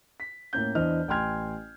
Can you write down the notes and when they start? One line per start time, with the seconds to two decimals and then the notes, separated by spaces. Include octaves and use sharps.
0.20 B6
0.53 A2 A#3 C#4 G6
0.75 E2 E3 D4 C5 D#5 F6
1.08 A1 G5 G#5 C6 F6 G#6